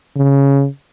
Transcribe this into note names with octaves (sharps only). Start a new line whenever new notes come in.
C#3